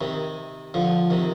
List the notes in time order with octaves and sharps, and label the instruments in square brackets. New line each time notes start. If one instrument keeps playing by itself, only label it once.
[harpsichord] C3 D#3
D3 F3
C3 D#3